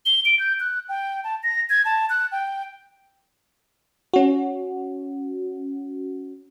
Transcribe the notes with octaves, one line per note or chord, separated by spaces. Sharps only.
G7
D7
G6
F#6
G5
A5
A#6
G#6
A5
F#6
G5
C#4 F#4